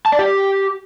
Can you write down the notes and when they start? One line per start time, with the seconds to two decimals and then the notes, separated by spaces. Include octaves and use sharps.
0.06 A5
0.12 D5
0.19 G4